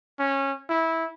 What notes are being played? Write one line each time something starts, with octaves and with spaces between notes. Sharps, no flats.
C#4
E4